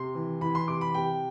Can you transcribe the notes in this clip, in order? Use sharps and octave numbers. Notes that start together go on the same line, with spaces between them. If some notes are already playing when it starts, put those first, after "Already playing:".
Already playing: C3 C6
E3
E3 B5
C6
C3 D6
B5
C3 G5